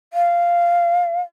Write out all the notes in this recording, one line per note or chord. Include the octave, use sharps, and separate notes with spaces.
F5